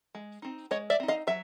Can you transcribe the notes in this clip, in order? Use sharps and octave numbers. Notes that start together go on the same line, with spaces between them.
G#3
C4 D#4
G#3 C#5 D#5
D5 E5
C4 D#4
D#5 F5
F#3 E5